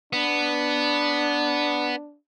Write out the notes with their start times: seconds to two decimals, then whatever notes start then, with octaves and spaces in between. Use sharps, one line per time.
0.13 B3 D4